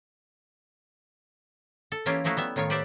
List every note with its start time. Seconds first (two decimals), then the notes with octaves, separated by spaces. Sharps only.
1.92 A4
2.06 E3 A#3 C#4 E4 F4 G4
2.24 F3 A3 D#4 E4 F#4 F5
2.37 G3 B3 E5
2.56 A2 D#3 F4 C#5
2.70 G4 B4 C5 D5 E5